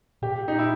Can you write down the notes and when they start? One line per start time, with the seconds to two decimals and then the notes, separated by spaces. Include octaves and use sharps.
0.22 A#2 G4
0.48 D#4
0.59 E4